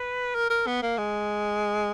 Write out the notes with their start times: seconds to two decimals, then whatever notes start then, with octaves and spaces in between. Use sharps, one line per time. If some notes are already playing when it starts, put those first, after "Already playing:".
Already playing: B4
0.35 A#4
0.50 A#4
0.67 B3
0.82 A#3
0.98 G#3